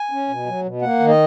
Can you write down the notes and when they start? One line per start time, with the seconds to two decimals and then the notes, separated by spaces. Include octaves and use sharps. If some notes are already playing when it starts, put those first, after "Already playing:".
Already playing: G#5
0.11 C#4
0.28 B2
0.46 F#3
0.64 B2
0.82 A#3 F#5
0.99 D#3
1.08 D#5